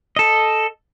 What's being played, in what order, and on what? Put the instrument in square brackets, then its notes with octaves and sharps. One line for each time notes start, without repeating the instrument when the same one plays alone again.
[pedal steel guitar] A4 D#5